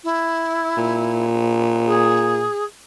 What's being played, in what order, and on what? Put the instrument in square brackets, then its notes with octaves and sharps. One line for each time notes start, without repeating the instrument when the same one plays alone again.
[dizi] E4
[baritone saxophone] A#2
[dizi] G#4